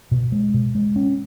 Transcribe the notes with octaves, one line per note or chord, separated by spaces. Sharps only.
B2
G#3
B2
G#3
C#4